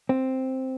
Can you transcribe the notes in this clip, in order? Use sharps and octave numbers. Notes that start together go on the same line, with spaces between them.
C4